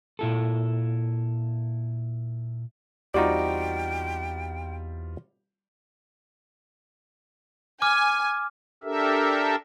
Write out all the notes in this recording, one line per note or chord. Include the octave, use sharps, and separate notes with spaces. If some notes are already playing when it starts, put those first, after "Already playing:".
A#2 E4 A4
E2 G3 C4 D#4 F4 F#4 D5 G5
G#5 D6 F6
D4 G4 A4 A#4 E5